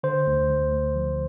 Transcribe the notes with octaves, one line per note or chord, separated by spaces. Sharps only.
D3 C5
D2
D2
D2
F3